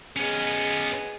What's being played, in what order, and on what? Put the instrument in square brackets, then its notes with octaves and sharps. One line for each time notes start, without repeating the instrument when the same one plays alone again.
[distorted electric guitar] B3 C#4 [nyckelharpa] G#4 D#5